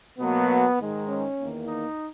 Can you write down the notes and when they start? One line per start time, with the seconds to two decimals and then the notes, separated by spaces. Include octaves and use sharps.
0.18 B2 F#3 A#3 B3
0.78 G#2 D#3 G#3
1.07 C#4
1.38 E2 D#3 A#3
1.67 D#4